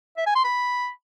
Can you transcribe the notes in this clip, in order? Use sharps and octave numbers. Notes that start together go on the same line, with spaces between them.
E5
G#5
C6
B5